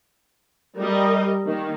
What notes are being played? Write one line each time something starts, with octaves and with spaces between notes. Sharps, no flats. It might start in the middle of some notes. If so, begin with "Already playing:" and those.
G3 A#4 D#5
D#3 A#3